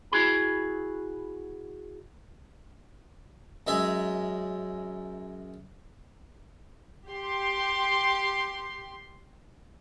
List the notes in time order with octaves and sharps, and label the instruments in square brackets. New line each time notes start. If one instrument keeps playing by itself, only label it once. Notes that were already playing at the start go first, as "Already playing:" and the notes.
[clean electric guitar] E4 F#4 G#4 B5
[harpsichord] F#2 G#3 G#4 E5 G#5
[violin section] G4 C6